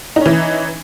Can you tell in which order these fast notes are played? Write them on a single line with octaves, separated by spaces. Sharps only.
D#4 C#4 E3